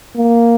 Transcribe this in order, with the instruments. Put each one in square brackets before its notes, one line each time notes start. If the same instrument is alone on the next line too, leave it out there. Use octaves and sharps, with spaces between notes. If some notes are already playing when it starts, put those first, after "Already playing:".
[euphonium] A#3